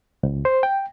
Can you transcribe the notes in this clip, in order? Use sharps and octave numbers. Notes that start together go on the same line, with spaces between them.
C#2
C5
G5